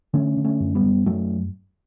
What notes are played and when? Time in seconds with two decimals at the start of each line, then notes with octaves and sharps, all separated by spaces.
0.14 D3 A3 C#4
0.37 D3
0.45 A3 C#4
0.60 F#2
0.75 G3 B3
0.83 F#2
1.06 F#2 F#3 A3